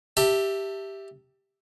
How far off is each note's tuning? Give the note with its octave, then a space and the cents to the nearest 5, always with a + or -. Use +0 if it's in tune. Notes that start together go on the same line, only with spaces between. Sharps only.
G4 +0 E5 +0 A5 +25